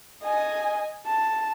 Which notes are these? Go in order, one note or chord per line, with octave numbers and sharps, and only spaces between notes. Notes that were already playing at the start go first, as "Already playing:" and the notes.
D#5 G#5
A5